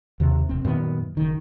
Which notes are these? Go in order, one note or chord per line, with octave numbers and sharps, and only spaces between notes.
D#2 C3
F1 C4
F#2 A#2 D#3 B3
F#1 D#3